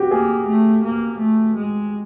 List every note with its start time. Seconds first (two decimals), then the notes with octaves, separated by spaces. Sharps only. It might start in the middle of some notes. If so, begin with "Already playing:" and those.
Already playing: F#4 G4
0.11 A#3 G#4
0.47 A3
0.83 A#3
1.19 A3
1.55 G#3